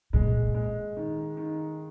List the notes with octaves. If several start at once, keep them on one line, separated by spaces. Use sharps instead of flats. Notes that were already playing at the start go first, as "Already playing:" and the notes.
A#2 G#3
G#3
D#3
D#3